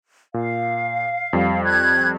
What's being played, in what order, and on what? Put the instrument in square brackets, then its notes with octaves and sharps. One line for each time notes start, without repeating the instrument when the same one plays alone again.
[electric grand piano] A#2 [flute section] F5
[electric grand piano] F2 G3
[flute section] F#6 G#6